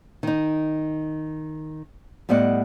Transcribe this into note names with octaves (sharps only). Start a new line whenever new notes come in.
D#3 D#4
A2 G3 B3 D5 D#5 F#5